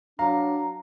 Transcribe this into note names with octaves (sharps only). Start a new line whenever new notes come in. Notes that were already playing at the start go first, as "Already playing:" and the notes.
F#3 D4 F5 A#5